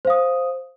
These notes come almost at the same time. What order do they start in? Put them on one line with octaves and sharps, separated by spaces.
C5 F5 D#6